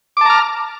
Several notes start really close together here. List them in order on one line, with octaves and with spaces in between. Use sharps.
D6 A5 A#5 F6